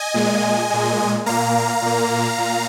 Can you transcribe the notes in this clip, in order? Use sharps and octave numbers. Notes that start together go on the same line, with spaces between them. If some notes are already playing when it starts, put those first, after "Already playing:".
Already playing: D#5 G#5
A#2 G#3
A#2 G#3
A#2 A#3 F5 A#5
A#2 A#3
A#2